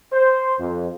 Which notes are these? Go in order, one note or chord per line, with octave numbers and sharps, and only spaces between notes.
C5
F2